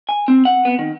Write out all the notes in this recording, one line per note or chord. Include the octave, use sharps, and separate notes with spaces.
G#5
C4
F#5
B3
D#3